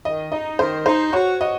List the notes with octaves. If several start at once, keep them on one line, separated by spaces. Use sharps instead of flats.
D#3 D#5
D#4 D#5
D#3 C5
D#4 C5
F#4 C#5
F#4 D#5